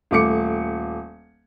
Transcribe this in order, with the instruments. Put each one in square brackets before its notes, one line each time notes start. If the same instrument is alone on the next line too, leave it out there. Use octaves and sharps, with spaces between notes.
[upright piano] D#1 A3 D6 C#7